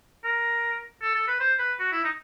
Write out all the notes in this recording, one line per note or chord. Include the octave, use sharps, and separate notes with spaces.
A#4
A4
A4
B4
C5
B4
F#4
E4
D#4